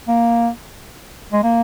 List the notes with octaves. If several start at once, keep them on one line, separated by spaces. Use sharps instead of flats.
A#3
G#3
A#3